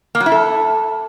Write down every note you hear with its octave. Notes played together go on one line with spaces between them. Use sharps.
A#3
F#3
E4
A4